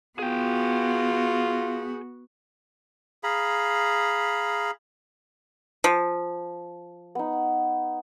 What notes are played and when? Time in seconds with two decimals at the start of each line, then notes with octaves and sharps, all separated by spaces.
0.19 B3 F4 F#4 G#4 G5
3.24 G#4 F5 A#5 B5
5.84 F3
7.15 B3 D#4